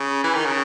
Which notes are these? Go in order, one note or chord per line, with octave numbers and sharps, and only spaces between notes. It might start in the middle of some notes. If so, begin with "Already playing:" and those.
Already playing: C#3
E3
D#3
C#3